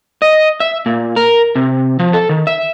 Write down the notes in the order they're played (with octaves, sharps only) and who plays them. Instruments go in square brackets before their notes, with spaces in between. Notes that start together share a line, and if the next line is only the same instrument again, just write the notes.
[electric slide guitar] D#5
E5
A#2
A#4
C3
F3
A4
D#3
E5